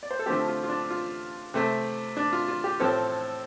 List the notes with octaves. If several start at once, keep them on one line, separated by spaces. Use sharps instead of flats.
D5
C5
A4
D3 F3 A3 C4 G4
F4
F4
D4
F4
C3 A3 C4
D4
F4
F4
G4
A2 F3 C4 A4